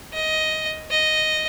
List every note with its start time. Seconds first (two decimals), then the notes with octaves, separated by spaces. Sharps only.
0.13 D#5
0.90 D#5